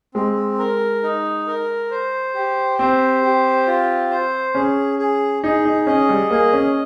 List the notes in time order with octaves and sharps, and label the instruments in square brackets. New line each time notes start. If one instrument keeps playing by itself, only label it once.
[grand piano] G#3 [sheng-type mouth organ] C4
[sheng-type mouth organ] A#4
D#4
A#4
C5
G4
[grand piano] C4 [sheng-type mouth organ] C5
[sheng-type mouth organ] G4
F4
C5
[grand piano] C#4 [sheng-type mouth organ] G#4
[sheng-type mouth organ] G#4
[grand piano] D#4 [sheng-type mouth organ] G#4
[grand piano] D#4
[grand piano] C#4 [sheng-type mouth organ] D#5
[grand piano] G3
[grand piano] A#3 [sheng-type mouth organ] G#4
[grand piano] C#4